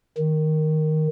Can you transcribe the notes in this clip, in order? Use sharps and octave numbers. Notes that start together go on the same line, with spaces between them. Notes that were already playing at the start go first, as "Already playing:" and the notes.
D#3